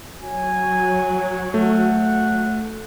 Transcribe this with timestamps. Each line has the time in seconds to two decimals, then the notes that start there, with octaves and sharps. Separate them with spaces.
0.21 F#3 G#5
1.54 A3 F#5